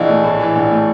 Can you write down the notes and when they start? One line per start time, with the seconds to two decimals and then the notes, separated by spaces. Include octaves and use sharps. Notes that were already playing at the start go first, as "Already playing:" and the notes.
Already playing: A#1 E3 D#5 F5
0.09 A3
0.24 A2
0.40 E3
0.55 A#1
0.71 A3